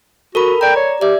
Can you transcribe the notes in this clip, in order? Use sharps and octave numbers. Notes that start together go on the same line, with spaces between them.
F#4 A4 A#4 B5
D5 G5 A#5
C#5
G4 D5 E5